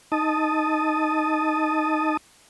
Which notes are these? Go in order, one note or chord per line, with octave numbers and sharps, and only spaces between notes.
D#4 A5 D#6